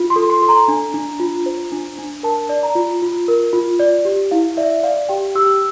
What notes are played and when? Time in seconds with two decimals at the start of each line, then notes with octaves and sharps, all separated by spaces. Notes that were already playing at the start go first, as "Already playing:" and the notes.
Already playing: F4
0.10 C6
0.16 A4
0.30 C6
0.42 A4
0.49 A#5
0.68 D4
0.94 D4
1.19 F4
1.46 C5
1.72 D4
1.98 D4
2.23 A#4 A5
2.49 D5
2.63 A#5
2.75 F4
3.02 F4
3.28 A#4
3.53 F4
3.79 D5
4.05 G4
4.31 E4 F5
4.57 D5 E5
4.83 D5 F5
5.09 G4 G5
5.35 G4 E6